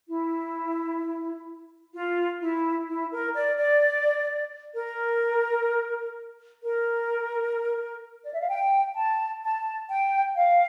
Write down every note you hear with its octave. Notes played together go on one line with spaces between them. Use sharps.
E4
F4
E4
E4
A#4
D5
D5
A#4
A#4
D5
E5
F5
G5
A5
A5
G5
F5